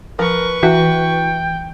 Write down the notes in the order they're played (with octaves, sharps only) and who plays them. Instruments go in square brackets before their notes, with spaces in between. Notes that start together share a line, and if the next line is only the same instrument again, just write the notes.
[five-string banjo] F3 [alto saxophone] A#4 [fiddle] B4 C#6
[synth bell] E3 [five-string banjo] F#4 [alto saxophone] G5